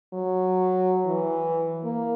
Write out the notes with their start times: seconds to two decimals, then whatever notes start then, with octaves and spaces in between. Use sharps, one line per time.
0.13 F#3
1.05 E3
1.84 A#3